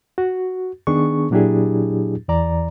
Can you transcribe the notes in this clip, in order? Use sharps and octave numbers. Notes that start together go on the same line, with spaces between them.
F#4
D#3 B3 D4 G#4 C#6
A#2 F#3 D4 E4 G4 G#4
E2 E3 D5 A#5